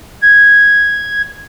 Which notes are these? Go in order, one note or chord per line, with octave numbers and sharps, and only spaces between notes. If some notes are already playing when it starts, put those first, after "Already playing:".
G#6